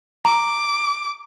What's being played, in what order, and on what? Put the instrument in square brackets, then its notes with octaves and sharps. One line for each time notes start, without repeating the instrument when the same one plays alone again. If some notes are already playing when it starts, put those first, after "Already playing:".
[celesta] A#5 [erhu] D6